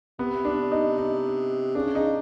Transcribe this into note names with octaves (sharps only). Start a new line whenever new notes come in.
C3 B3
D4
D#4
D#4
C#3 D4
C#3 D#4